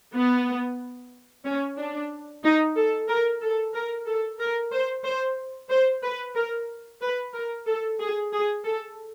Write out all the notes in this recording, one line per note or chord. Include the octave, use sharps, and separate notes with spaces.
B3
C#4
D4
D#4
A4
A#4
A4
A#4
A4
A#4
C5
C5
C5
B4
A#4
B4
A#4
A4
G#4
G#4
A4